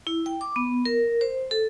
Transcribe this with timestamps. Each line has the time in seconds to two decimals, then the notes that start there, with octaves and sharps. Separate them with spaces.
0.07 E4
0.26 G5
0.41 D6
0.56 B3
0.86 A#4
1.21 C5
1.51 A4